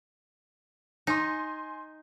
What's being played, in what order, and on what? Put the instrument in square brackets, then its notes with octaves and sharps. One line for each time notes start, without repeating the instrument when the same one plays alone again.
[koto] D#4 [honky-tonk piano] G#5 C6